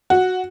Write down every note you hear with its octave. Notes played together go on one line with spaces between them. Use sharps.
F#4